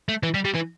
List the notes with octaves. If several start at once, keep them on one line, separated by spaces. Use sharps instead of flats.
A3
E3
G3
G3
E3